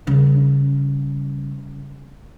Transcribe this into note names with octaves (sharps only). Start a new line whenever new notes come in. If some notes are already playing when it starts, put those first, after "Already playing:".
C#3 G3